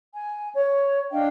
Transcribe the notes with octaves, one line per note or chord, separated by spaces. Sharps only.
G#5
C#5
D4 D#5 F5 G5